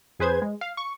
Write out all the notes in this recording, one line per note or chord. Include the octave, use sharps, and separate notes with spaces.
F2 G#4 B4 C5 G#6
G#3
F5
C#6